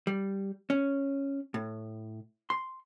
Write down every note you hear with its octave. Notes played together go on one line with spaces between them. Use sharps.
G3
C#4
A2
C6